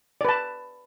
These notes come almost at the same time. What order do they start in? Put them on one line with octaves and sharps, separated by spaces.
D5 B4 A5